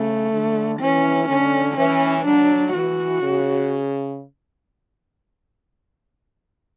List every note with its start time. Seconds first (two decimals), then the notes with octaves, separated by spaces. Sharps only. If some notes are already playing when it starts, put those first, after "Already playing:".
Already playing: C#3 A3
0.32 D3
0.80 E3 C#4
1.29 D3 C#4
1.77 E3 C#4
2.25 F#3 D4
2.73 E3 F#4
3.21 C#3